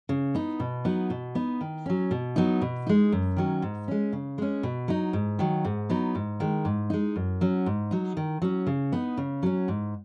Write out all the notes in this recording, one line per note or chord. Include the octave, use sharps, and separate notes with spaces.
C#3
B3 D#4
B2
F#3 B3 D#4
B2
B3 D#4
D#3
F#3 C#4
B2
F#3 B3 D#4
B2
G#3 D#4
F#2
D#3 F#3 C#4
G#2
G#3 C#4
C#3
G#3 C#4
B2
F#3 D#4
G#2
D#3 F#3
G#2
F#3 B3 D#4
G#2
D#3 G#3
G#2
G#3 D#4
F#2
F#3 C#4
G#2
F#3 D#4
D#3
F#3 C#4
C#3
B3 D#4
C#3
F#3 C#4
G#2